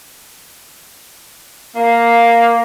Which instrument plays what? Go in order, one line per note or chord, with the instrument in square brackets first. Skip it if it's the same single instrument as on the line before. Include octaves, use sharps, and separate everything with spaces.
[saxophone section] A#3